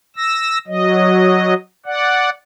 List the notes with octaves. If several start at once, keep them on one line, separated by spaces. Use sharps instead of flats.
E6 A#6
F#3 D#5
D5 F#5